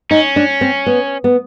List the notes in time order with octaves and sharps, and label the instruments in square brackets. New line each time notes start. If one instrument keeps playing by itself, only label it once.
[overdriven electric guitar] C#4 [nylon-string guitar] D#4
[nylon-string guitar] D4
C4
B3
B3